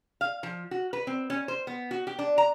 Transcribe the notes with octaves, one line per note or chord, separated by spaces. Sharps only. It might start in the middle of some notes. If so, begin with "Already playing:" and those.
F5
F3
F#4
B4
C4
C#4
C5
B3
F#4
G4
D4
A#5